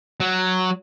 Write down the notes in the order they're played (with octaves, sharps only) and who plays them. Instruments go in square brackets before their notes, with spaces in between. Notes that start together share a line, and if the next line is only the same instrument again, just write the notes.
[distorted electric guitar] F#3